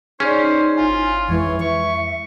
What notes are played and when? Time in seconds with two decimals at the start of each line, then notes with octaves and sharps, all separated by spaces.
0.20 C#4 D#4 G#4 C5 D5
0.77 G#1 E4 F4 G#5
1.29 F2 E3 G#3 C#5
1.61 E5 C#6